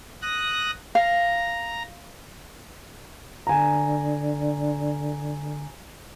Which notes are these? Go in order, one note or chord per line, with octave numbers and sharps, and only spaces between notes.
D#6 F#6 A#6
F5 A#5
D3 G#5 A#5